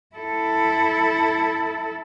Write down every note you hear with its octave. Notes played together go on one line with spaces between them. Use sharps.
E4 A4